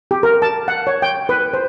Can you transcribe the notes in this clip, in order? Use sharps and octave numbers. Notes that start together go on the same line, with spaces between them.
G4
A#4
A5
F#5
C#5
G5
B4
C5